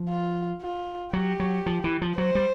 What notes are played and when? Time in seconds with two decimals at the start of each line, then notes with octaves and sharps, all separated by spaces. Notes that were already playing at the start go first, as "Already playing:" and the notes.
Already playing: F3
0.09 F4
0.62 F4
1.13 F#3 G4
1.40 F#3
1.66 F3
1.84 E3
2.02 F3
2.18 F#3 C5
2.35 G3